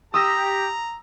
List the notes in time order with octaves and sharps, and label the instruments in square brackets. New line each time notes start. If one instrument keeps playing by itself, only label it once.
[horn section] G4 [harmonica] A#5 [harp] D#6 E6 A#6